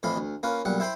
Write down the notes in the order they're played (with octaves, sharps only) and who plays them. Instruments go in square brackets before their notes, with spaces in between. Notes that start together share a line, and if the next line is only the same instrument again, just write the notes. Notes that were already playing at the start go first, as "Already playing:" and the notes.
[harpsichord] F2 A2 E3 F3 F5 B5
D2
A#3 C#4 F4 B4
B1 A#2 G3 F#5
E4 C5 G5 B5 C6